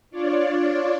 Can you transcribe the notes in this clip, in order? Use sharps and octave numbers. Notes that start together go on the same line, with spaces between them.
D4 F4 C#5 D5